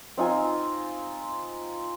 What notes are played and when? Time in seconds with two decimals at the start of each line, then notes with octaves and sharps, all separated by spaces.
0.17 C4 D#4 F4 G#5